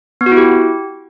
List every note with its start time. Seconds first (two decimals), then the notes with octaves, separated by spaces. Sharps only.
0.21 B3
0.26 F#4
0.32 E4
0.37 G4